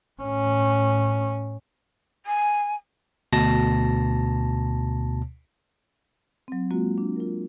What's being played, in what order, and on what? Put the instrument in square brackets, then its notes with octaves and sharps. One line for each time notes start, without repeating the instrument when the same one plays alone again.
[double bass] A2 C#4
[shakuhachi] G#5
[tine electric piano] D2 B2 A5 A#6
[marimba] F#3 C4
G#3 A#3 C4 F4 F#4
D4
F4 A#4